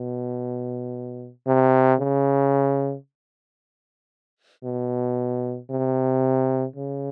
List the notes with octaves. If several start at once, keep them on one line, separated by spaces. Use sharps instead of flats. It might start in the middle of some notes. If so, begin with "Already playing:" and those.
Already playing: B2
C3
C#3
B2
C3
C#3